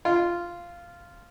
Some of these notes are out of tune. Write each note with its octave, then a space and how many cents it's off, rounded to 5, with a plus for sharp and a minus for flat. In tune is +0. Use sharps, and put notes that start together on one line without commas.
F4 -10